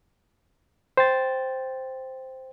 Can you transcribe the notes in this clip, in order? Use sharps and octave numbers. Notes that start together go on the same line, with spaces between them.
C5 G5 A6